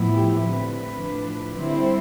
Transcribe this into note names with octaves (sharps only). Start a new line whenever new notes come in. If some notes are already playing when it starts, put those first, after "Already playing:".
Already playing: A2 F3 B3 E4
G4
D3 A3 C4 B4
A2 F3 A3 D4
D3 G3 C4 E4 C5